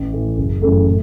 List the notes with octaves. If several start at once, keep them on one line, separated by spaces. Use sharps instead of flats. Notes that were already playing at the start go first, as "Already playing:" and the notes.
Already playing: A1
A2 E3
F#1
F#2 C#3 E3 A3
A2